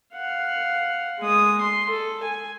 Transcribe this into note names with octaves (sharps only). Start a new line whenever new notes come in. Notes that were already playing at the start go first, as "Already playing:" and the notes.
F5 F#5
G#3 D#6
C6
A4
G#5